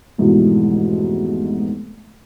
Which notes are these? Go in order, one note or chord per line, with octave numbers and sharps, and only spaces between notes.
F1 G#2 B2 E3